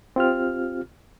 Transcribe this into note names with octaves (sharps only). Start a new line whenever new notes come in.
C4 F4 G4 F6